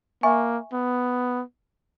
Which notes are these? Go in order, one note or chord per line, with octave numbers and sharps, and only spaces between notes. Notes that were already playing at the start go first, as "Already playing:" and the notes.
A#3 E5 G#5 C#6
B3